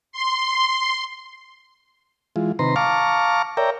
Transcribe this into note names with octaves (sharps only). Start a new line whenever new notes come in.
C6
E3 G#3 F4
C3 D#3 B4 A#5 C6
F5 A5 A#5 C#6 D6 F6
A#4 C#5 D5 E5 G5 A#5